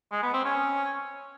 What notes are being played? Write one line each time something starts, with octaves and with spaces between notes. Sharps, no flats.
G#3
B3
C4
C#4